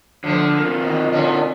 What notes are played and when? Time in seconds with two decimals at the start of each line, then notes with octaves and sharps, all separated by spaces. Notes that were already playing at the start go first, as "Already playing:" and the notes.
0.24 D3 F3 A3 B3
0.59 C4 F4 A#4
0.80 B2 D#3
1.12 B2 D3 C#4